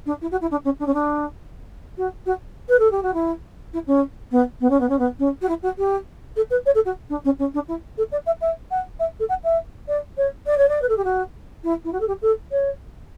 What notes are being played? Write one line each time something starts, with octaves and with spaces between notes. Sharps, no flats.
D4
E4
F#4
E4
D4
C#4
D4
C#4
D4
F#4
F#4
B4
A4
G4
F#4
E4
E4
C#4
B3
B3
C#4
B3
C#4
B3
C#4
F#4
E4
F#4
G4
A4
B4
C#5
A4
F#4
D4
C#4
C#4
D4
E4
A4
D5
E5
E5
F#5
E5
A4
F#5
E5
D5
C#5
D5
C#5
D5
B4
A4
G4
F#4
E4
E4
F#4
A4
G4
A4
C#5